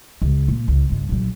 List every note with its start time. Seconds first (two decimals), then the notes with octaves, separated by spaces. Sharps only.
0.22 C#2
0.48 A#2
0.68 C#2
0.90 C#2 G2
1.09 A#1 F#3